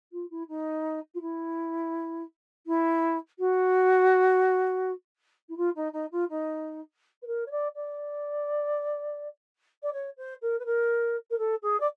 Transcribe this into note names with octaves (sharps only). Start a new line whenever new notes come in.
F4
E4
D#4
F4
E4
E4
F#4
E4
F4
D#4
D#4
F4
D#4
B4
A#4
C#5
D5
D5
D5
C#5
C5
A#4
B4
A#4
A#4
A4
G#4
D5